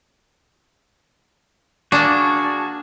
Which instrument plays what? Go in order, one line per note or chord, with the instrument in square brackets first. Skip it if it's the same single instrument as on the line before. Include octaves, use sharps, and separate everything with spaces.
[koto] A#3 D4 [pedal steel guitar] F#4 G#4 A5